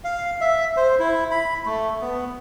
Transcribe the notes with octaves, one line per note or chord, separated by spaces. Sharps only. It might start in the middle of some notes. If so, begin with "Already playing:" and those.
F5
E5
C5
E4
B5
A3
B3